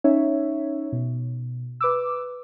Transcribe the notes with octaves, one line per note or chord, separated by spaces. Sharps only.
C#4 D#4 C#5 E5
B2
B4 D6 E6